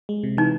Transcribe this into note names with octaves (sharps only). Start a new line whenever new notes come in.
G#3
C3
E3 D#4